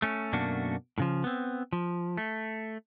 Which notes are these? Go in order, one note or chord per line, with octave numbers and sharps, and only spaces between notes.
A3 C#4
F#2 B2 A3 A#3 D4 F#4
A2 C#3 F3
B3 C4
F3
A3